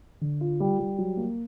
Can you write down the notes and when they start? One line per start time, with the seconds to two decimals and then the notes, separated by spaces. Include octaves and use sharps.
0.21 D3
0.41 F4
0.60 G3
0.79 G3
0.98 F#3
1.17 A#3